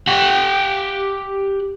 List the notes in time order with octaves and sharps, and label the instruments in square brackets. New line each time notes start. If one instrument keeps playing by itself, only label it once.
[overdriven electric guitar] G4 F#5